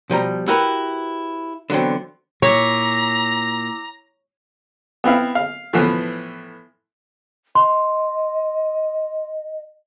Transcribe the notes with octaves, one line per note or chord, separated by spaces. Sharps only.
B2 F3 G3 A#5
E4 F#4 G4 A#4 B4
D3 E3 F#3 B3 C4
A#2 E4 C#5 A#5 D6 E6
B3 C4 E4 F5
F5
A2 E3 F3 B3
D#5 C6